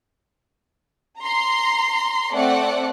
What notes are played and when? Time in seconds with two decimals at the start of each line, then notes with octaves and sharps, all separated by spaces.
1.20 A#5 C6
2.34 A3 C4 D5 F#5